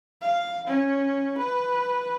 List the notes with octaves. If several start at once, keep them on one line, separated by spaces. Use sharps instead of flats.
F5
C#4
B4